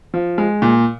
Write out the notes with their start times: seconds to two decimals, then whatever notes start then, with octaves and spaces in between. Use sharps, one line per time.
0.14 F3
0.38 G#3
0.62 A#2